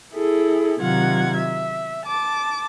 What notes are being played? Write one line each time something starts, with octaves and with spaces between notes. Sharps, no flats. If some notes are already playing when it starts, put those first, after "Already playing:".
E4 G#4 A4
C3 D#3 F#3 F4 F#5 G#6
E5
A5 D6